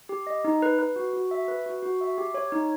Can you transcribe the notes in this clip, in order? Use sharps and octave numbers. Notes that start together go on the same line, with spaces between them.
G4
D#5
D#4
B4
B4
F#4
F#4
E5
B4
F#4
F#4
E5
G4
C#5
D#4